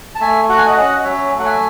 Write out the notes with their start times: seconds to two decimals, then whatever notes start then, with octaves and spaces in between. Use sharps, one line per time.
0.15 A5
0.21 A3 E5 G#5
0.49 F#4 F#5
0.58 G#5
0.66 D#5 F#5
0.77 C#4 D#5 F#5
0.96 F#5
1.04 F#3 C#5 E5
1.32 A3
1.39 F#5
1.46 E5 G#5